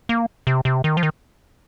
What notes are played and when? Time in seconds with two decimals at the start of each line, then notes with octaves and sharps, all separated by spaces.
0.09 A#3
0.47 C3
0.65 C3
0.84 D#3
0.97 F3
1.03 D#3